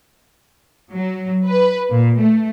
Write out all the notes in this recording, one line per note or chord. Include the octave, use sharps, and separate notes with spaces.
F#3
B4
A#2
A3